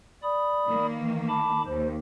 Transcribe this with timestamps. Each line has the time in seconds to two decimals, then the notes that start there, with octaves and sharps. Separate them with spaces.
0.23 D5 B5 D#6
0.67 D#3 A#3
0.98 E3
1.28 A5 B5 D6
1.67 D#2 C5